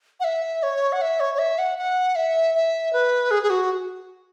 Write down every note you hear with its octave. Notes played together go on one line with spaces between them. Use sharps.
F#5
E5
C#5
F#5
E5
C#5
C#5
E5
F#5
F#5
E5
E5
B4
G#4
G#4
F#4